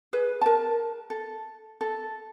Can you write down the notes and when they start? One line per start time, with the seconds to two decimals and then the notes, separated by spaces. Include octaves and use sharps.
0.13 G#4 B4
0.41 A#4 A5
1.10 A4
1.81 A4